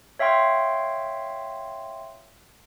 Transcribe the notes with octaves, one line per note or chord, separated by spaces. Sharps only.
C#5 E5 F5 G5 C6